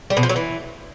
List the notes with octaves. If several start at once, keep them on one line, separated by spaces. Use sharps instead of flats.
G3
B2
F3
F#3
E3